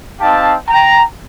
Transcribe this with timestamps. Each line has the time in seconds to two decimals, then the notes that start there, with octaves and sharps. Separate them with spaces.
0.20 C4 D#4 G4 F5 A5
0.69 G5 A#5